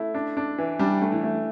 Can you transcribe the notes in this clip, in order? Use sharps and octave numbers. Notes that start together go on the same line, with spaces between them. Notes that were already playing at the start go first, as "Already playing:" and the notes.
Already playing: A3 E4
D4
D4
E3
G3 D4
A3
E3
A3